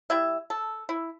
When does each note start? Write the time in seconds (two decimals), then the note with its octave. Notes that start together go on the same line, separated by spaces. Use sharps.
0.10 G3 E4 E5
0.50 A4
0.89 E4